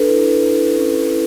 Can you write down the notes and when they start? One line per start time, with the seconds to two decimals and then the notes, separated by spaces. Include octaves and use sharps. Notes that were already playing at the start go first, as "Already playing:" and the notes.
Already playing: D4 A4 B4
0.08 E4
0.43 E4
0.76 C#4
1.12 E4